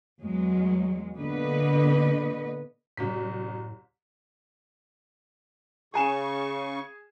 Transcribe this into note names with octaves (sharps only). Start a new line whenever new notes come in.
E2 F#3 G#3
A#2 D3 B3 B4 D#5
C2 F#2 A2 B6
C#3 G#4 G#5 C#6 E7